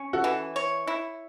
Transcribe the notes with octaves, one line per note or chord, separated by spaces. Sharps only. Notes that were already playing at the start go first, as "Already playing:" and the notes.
Already playing: C#4
F#4 A4
E3
C#5
E4